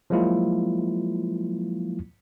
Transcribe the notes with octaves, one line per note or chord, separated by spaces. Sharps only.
F3 F#3 G#3 A#3 E4 F4